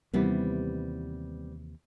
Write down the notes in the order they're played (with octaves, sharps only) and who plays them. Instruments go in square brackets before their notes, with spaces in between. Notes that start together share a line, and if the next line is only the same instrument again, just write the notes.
[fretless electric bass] D#2 C3 E3 [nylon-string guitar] G3 B3 C4